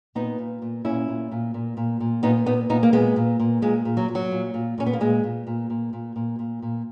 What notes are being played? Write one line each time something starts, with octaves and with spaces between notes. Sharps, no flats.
A#2 B3 D#4
A#2
A#2
A#2 C#4 E4
A#2
A#2
A#2
A#2
A#2
A#2 B3 D#4
A#2 B3 D#4
A#2 B3 D#4
A#3
A#2 G#3 B3
A#2
A#2
A#2 G#3
A#2
F#3
A#2
F#3
A#2
A#2
A#2 C#4
B3
A#3
A#2 G#3
A#2
A#2
A#2
A#2
A#2
A#2
A#2